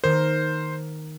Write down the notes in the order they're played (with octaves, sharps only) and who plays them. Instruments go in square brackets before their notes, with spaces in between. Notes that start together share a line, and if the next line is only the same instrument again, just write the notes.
[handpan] D#3 A#4 [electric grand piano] C5